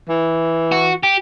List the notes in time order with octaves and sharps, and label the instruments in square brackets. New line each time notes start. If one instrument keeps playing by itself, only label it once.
[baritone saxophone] E3
[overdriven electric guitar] F#4
G4